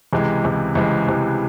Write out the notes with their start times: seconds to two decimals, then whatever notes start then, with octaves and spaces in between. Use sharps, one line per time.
0.13 C#2 C3 E3 G#3
0.44 C#2 C3 E3 G#3
0.75 C#2 C3 E3 G#3
1.08 C#2 C3 E3 G#3